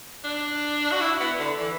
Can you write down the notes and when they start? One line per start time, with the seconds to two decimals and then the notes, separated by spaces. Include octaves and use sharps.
0.24 D4
0.92 F#4
1.01 E4
1.20 B3
1.39 D3
1.59 E3